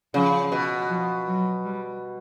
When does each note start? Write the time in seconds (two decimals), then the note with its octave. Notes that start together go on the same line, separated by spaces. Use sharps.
0.14 C#3 F3
0.52 B2
0.89 F3
1.27 F#3
1.64 G3